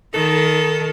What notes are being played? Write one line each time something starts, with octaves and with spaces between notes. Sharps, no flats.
D#3 A4